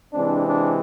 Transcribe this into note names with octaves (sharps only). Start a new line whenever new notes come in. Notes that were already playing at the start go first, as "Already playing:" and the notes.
C3 E3 G#3 C4 D4
D4